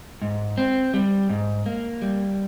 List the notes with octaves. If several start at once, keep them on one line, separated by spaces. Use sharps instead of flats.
G#2
C4
G3
G#2
A#3
G3